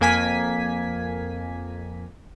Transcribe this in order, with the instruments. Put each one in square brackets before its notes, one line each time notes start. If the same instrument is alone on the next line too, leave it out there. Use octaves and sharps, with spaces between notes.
[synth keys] F2 A#3 G#5 B6